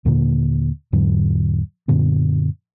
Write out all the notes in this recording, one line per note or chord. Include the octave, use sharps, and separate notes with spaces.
D#2 A#2 D3 A#3
E2 G#2 D3 F#3
F#2 A#2 D3 B3